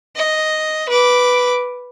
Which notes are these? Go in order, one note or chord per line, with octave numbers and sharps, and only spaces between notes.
D#5
B4 D6